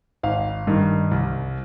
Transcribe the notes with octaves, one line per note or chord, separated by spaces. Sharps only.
G#1 F5
G2 D#3
C2